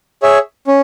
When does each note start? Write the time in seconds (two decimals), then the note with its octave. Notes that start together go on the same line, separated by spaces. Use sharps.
0.23 G#4 C#5 E5
0.67 C#4